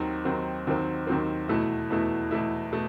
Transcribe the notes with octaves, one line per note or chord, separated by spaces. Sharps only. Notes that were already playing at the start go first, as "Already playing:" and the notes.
Already playing: D#2 D#3 F#3 C4
D#2 D#3 F#3 C4
D#2 D#3 F#3 C4
D#2 D#3 F#3 C4
E2 B2 A3 E4
E2 B2 A3 E4
E2 B2 A3 E4
B2 A3